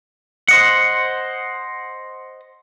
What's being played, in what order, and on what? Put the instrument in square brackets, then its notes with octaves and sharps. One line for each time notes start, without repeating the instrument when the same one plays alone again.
[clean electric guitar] C5 D#5 F#5